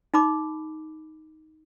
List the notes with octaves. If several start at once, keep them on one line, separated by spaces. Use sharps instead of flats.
D#4 B5 D6